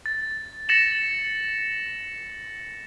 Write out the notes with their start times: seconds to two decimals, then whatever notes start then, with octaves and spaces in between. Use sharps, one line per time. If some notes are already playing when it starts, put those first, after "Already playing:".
0.06 A6
0.69 A6 A#6 C#7 E7 F#7